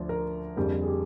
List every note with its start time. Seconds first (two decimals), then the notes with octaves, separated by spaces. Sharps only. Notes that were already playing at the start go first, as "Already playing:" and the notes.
Already playing: D2 D3 F3 D5
0.09 A#4
0.56 F2 D3 G3 A#3 G#4
0.82 G#4
0.88 G4